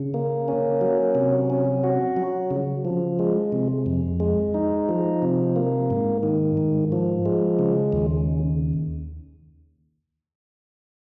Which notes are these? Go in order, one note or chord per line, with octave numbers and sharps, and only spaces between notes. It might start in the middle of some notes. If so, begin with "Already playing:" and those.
Already playing: C#3
A#3
C#4
F#3
C3
C#4
F#4
F#3
C#3
F3
G#3
C3
F2
G#3
D#4
F3
C3
A#3
G#2
D#3
G#2
F3
G#3
C#3
D#2